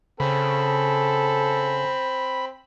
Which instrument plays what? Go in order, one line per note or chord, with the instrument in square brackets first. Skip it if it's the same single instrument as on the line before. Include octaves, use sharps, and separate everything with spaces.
[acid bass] C#3 [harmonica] C4 [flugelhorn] A4 [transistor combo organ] B5